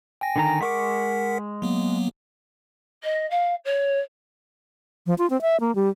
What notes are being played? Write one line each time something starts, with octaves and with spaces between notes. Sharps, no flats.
G5 G#5 A#6
D3 D#3 A#5
G#3 A#4 F#5 C#6 D6 B6
F#3 A#3 B3
D#5
F5
C#5
F3
F4
C4
E5
A#3
G3